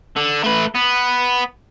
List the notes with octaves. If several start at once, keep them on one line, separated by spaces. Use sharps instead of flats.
D3
A3 B4
B3